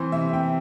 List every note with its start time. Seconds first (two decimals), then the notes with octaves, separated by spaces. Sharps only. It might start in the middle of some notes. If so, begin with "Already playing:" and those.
Already playing: E3 C4 C5
0.12 C3 E5
0.33 C3 G5